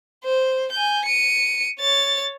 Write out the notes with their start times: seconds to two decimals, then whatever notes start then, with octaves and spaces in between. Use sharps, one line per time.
0.24 C5
0.72 G#5 G6
1.05 C#7 D#7
1.80 C#5 A6